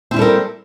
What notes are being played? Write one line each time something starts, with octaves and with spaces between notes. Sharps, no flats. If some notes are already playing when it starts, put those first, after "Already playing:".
G3 C4 E4 A4 A#4